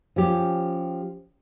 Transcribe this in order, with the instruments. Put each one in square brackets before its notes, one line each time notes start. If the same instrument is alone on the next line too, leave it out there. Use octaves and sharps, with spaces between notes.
[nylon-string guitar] F3 C#4 G4